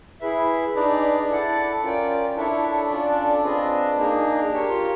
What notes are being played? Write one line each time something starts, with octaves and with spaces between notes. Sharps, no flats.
E4 G#4 B4 E5
D4 D#4 G#4 B4 D5
E4 A4 D5 F#5 A5
C#4 F4 A#4 D5 G5
D4 E4 A4 C#5 E5
C#4 F4 A4 D5
C4 F4 G#4 B4 D#5
A#3 D#4 G#4
G4 A#4 C#5
F4